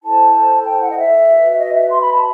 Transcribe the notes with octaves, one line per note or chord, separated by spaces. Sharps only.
E4 A4 C5 A5
G5
F#5
D#5
E5
F#4 B4
E5
D#5
E5
C6
B5
A5